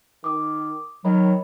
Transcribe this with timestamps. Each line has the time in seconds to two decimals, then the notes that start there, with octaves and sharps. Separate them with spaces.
0.24 D#3 D6 D#6
1.05 D#3 F#3 C#5 D#5 B5